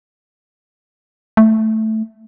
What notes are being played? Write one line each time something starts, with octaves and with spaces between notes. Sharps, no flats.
A3